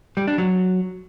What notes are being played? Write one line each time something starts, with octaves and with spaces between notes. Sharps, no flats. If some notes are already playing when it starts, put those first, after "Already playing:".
G3
D4
F#3